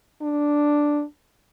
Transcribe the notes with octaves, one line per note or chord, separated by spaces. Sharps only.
D4